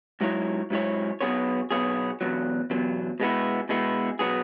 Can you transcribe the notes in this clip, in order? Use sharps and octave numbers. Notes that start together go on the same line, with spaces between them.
G#2 F#3 E4 C#5
G#2 F#3 E4 C#5
B1 B2 B3 G#4 C#5
B1 B2 B3 G#4 C#5
E2 B2 F#3
E2 B2 F#3
B2 G#3 B3 E4
B2 G#3 B3 E4
B2 F#3 B3 G#4